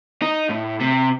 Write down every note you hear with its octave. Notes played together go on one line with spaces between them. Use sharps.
D#4
A2
C3